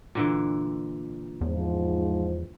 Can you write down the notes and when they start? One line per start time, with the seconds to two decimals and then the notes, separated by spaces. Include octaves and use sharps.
0.15 A#2 D3 E3
1.41 E2 G#2 F3